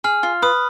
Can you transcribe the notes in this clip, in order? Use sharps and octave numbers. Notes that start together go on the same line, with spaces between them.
G#4 F6
F4
B4 D#6